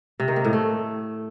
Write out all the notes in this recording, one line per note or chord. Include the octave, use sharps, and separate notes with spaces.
C3
D#3
A#3
A2
A3